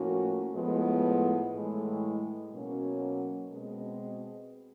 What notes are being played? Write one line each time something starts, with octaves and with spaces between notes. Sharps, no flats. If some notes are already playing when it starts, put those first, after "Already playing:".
Already playing: A2 F3 A#3 C#4 F#4
A2 F3 G#3 B3
A2 E3 G#3
B2 F#3 A#3 C#4
B2 G#3 C4